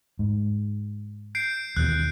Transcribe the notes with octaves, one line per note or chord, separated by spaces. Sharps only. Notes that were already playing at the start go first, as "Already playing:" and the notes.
G#2
G6 C7 D7
D#2 B2 E3 F#6